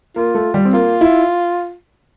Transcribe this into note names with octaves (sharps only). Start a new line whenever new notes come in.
A#3 F4
A3
G3
C4
A#3 F4
E4